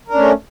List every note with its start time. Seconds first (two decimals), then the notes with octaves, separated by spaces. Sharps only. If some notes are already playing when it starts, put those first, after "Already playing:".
0.08 A#4
0.11 D4
0.14 C#4
0.17 A3